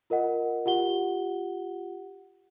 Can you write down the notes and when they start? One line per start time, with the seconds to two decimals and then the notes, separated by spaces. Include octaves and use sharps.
0.10 F4 A#4 D#5 F#5
0.66 F4 G4 F#5 G7